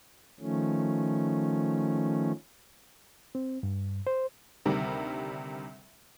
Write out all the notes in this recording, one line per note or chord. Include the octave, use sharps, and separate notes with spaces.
D#3 F3 A3 C#4
C4
G2
C5
D2 C3 D#3 G3